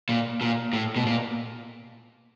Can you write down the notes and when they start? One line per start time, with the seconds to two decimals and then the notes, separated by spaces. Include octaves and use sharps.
0.09 A#2
0.41 A#2
0.73 A2
0.96 B2
1.06 A#2